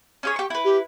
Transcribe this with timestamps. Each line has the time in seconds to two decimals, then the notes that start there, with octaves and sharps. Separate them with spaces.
0.23 C#4 G#4 C#5
0.36 G4 C#6
0.50 E4 B4
0.65 G4